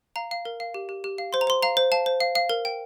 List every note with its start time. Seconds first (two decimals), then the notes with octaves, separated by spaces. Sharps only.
0.16 F5 A#5
0.31 F5
0.45 A#4
0.60 F5
0.74 G4
0.89 G4
1.04 G4
1.18 F5
1.33 C5 C6
1.41 A#5
1.47 C5 C6
1.62 F5 A#5
1.77 C5
1.92 F5 A5
2.06 C5
2.20 F5
2.35 F5
2.49 A#4
2.65 G5